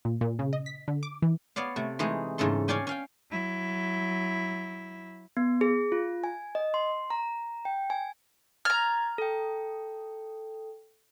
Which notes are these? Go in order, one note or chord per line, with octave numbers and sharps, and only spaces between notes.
A#2
A#2
C#3
D#5
B6
D3
D6
E3
B3 C#5 D5 F5
C3 A3
E3 G#3 A3 D#4 G#4
E2 G#2 C#3 A3 A4 C6
C#4 C#5 D5 F5 G5 G#5
C#4 F5 G5
F#3 E4
B3
G#4
F4
G#5
D#5
C6
A#5
G5
G#5
A#5 F6 G#6 A6
A4 G5